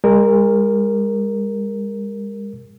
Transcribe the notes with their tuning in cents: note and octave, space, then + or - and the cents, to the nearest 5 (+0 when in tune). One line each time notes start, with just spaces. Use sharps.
G#3 -45 A#4 +0